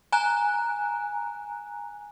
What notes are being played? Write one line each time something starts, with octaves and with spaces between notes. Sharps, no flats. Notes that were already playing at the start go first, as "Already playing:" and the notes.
G#5 A#5 F#6